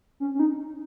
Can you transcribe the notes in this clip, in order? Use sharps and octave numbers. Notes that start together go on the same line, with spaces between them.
C#4
C#4
D#4